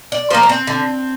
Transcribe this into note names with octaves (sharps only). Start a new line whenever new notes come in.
D5
F3 A#3 C5
D4
C4
D3